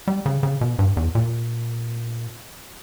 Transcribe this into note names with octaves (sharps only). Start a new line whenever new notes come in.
G3
C#3
C#3
B2
G2
E2
A#2